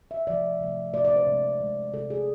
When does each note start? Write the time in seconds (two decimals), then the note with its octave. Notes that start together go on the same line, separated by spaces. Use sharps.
0.11 E5
0.27 C3 F3 A3 D5
0.60 C3 F3 A3
0.93 C3 F3 A3 D5
1.05 D5
1.16 C5
1.27 C3 G#3
1.60 C3 G#3
1.93 C3 G#3 A4
2.10 G#4